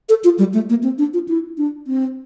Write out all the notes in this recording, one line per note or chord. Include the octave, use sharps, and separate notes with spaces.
A4
F4
G3
A3
A#3
C4
D4
F4
E4
D4
C4